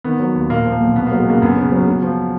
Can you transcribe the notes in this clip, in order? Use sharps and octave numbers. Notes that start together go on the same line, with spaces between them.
D#3 B3
F#3
D#2
A#2 A#3
F3
A#3
B1
B2 B3
F#3 A#3
G#3
C#2 A#3
F#2 B3
C#3
F#3
C#3
F3